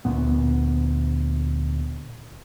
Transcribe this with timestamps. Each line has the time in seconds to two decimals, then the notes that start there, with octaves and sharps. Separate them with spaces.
0.05 D2 A#2 B3